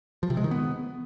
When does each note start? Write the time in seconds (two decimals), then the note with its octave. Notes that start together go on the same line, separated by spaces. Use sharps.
0.23 F3
0.30 C3
0.37 G#3
0.44 D#3
0.51 B3